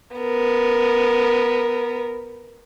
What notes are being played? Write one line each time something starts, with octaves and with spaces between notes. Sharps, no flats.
B3 A#4